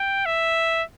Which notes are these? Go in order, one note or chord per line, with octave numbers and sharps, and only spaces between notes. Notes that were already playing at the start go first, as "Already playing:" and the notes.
Already playing: G5
E5